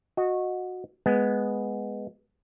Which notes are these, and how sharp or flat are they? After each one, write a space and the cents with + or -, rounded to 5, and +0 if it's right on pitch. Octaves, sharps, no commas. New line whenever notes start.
F#4 -20 D#5 +0
G#3 +0 B3 +0